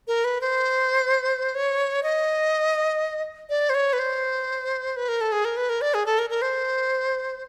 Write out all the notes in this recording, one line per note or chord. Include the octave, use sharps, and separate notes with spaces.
A#4
B4
C5
C#5
D#5
D5
C5
C#5
B4
C5
B4
A#4
A4
G#4
A#4
B4
A#4
D5
G#4
A4
A#4
A#4
C5